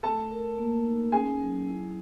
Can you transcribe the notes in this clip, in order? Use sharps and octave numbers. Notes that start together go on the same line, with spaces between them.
A3 A4 A5
A#4
A#3
D#4
C#4 G#4 G#5
F#3
E4